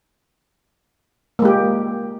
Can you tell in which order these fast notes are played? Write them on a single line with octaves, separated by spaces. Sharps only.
A#3 G#3 G4